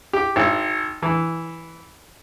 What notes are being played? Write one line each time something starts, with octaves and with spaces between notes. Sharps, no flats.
G4
G#1
E3